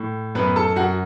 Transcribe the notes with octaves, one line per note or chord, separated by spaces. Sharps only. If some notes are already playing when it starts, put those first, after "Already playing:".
Already playing: A2
F#2 B3 B4
A4 A5
F#2 F#4 F#5